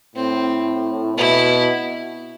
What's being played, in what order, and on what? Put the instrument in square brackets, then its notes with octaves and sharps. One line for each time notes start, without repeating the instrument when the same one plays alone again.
[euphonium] A2 [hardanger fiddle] C4
[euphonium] B2 [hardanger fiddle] E4